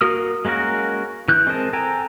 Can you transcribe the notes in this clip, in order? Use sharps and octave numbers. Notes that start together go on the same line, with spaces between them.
A#3 F#4 A#4 D#6 F6
G#3 A#3 C#4 F#4 A#4
E3 F#6 G6
G#3 C4 A#4 D#5 A5
A4 G5 G#5 A#5